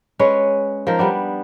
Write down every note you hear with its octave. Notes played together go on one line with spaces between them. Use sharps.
G#3 C#4 B4 C#5
F3 D#4 A#4
G3 B3 D4